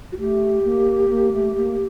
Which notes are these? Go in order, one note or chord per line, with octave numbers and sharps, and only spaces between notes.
F#4
A3 G4
A#3
A#3
A3
A#3